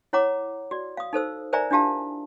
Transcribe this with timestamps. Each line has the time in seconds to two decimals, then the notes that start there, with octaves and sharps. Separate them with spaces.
0.13 E4 C#5 F#5 A#5 D6
0.71 F#4 D5
0.97 F5 D#6
1.13 D#4 A4 C5 E6
1.53 A#4 C5 D5 E5 G#5 A#5
1.71 D4 E4 F4 G4 F5 A5